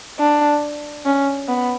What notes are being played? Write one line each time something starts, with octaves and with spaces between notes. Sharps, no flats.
D4
C#4
B3